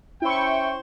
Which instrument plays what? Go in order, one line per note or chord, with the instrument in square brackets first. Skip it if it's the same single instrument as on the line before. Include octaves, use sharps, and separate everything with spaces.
[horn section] C#4 C5 G5 [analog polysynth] E4 C#6